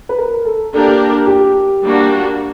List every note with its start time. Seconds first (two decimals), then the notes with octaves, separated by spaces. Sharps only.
0.09 B4
0.18 A#4
0.45 A4
0.73 A#3 D4 G4 A4 A#4
1.27 G4
1.83 G3 A#3 D4 F#4